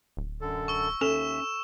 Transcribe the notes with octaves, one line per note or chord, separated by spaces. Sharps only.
D1
F#2 D3 A4
C#6 E6
D#2 C#4 A4 E5 E7